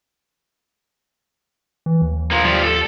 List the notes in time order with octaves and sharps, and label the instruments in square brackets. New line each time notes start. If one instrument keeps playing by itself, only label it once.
[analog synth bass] E3
D#2
[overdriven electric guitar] F3 A#3
F3 G3
A4